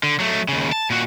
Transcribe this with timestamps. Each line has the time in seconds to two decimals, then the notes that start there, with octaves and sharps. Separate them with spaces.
0.03 D3
0.20 F#3 A3
0.48 D#2 C#3
0.72 A5
0.90 A#2 F#4